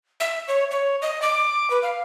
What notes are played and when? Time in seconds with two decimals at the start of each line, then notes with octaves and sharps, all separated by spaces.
0.20 E5
0.48 C#5
0.71 C#5
1.02 D#5
1.22 D6
1.70 B4
1.83 F5